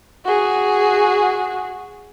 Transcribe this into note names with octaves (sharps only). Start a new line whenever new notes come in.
F#4 G#4